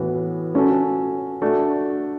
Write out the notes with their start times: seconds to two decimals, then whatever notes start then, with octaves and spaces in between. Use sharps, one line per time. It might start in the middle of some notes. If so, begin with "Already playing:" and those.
Already playing: A2 E3 B3 F#4
0.54 A3 C#4 F#4 A4
1.42 A3 D4 F#4